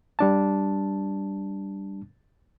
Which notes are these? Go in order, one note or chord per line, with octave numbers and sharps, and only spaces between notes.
G3 D4 A5